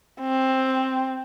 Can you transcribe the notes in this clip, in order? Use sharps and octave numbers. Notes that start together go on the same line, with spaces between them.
C4